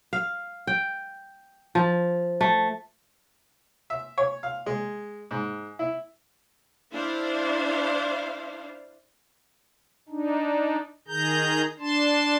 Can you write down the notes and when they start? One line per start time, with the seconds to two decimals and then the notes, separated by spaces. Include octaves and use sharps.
0.13 F5
0.67 G5
1.75 F3
2.41 A3
3.90 E5
4.18 C#5
4.43 F5
4.66 G#3
5.31 G#2
5.79 E4
6.94 D4 E4 C5 F5
10.09 D4 D#4
11.08 D#3 G#4 A#5 G6
11.79 D4 A5 C6